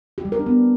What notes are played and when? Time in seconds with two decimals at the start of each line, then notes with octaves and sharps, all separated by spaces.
0.18 G4
0.25 G3
0.32 A#4
0.39 D4
0.46 B3